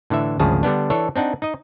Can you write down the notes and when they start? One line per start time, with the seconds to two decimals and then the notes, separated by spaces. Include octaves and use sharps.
0.10 A2 D3 E3 E5
0.39 G#1 D2 C#3 F3 G#4 A5
0.63 D3 G3 B3 D4
0.90 E3 D4 A4 C#5
1.16 C4 D4 D#4 F#5
1.42 D#4 D#5